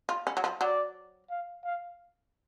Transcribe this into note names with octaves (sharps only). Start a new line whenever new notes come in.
F4
C#4
F#3
F3
F#3 D5
F5
F5